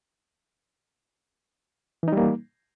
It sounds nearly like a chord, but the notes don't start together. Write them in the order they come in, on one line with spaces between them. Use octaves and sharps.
E3 D#4 G3 A#3